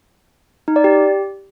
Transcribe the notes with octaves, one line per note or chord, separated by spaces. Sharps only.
D#4
D5
G4